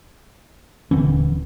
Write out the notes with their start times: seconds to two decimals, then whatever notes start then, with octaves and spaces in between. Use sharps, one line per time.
0.91 D#1 D3 E3 C4 C#4